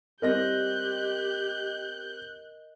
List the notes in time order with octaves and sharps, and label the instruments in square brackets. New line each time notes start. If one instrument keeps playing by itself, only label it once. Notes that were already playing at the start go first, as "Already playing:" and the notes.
[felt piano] G3 C4 A#6 [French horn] G4 [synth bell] A#4 D#5 [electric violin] F#6 G6